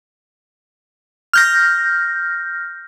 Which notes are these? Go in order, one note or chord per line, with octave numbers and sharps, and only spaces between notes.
F6 G6 A#6